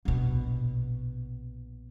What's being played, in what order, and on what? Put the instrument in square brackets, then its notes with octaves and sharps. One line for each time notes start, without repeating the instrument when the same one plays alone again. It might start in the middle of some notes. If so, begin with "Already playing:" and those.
[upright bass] A#1 B2